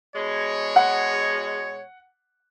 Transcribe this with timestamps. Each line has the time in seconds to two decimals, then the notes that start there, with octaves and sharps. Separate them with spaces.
0.15 B2 G#3 C#5
0.76 F#5